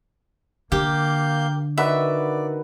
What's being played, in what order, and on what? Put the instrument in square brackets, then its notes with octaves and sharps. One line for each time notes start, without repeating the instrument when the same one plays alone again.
[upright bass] D3 [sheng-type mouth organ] A#3 F5 G6 [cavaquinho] G4
[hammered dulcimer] D#3 F#4 B4 [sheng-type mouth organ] D5 [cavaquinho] E5